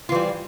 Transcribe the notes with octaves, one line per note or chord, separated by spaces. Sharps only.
E3 G3 F4